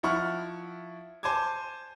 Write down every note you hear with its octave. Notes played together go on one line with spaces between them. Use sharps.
F3 E4 F#5 C#6 F6
C5 G#5 A5 D6 G#6